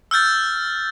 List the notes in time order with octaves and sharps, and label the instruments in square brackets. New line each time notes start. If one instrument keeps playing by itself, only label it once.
[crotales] E6 F6 G6 A6